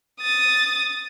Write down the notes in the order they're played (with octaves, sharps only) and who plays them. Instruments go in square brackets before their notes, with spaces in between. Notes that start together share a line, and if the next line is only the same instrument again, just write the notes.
[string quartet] D#6 A6